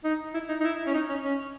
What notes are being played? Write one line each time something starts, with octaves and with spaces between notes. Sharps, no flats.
D#4
E4
D#4
D#4
E4
C#4
D#4
C#4
C#4